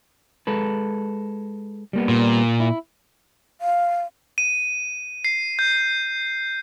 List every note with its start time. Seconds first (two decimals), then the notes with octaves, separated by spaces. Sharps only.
0.47 G#3 A4 B4
1.93 G3 A#3 B3
2.09 A#2
2.60 E4
3.60 F5
4.38 D#7
5.25 C7
5.59 G6